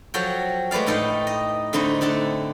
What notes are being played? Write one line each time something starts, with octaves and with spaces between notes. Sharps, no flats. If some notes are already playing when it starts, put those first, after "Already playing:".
F3 F#3 F#4 A4 G5
G#3 A3 B4 D5 F5
A2 D#4 A4 G5 C6
D#5
D3 A3 C4 D#4 E4
A3 D4 A4 F#5